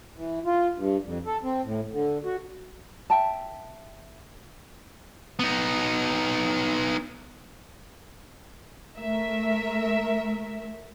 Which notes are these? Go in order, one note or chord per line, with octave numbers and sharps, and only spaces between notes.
E3
F4
G2
F2
A4
C4
A2
D3
F#4
E5 G5 A5
B3 D#4
A3 A#4 E5